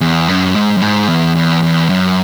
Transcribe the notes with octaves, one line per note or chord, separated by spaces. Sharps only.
E2
F#2
G#2
F#2
G#2
E2
E2
E2
F#2